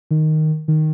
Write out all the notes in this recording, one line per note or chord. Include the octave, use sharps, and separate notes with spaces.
D#3
D#3